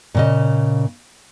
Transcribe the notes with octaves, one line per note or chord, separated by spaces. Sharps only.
A#2 C#3 D#5